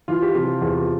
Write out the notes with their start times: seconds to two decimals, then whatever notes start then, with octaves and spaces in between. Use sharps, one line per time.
0.08 E3 F4
0.22 G4
0.34 C3 F3 F4
0.61 E2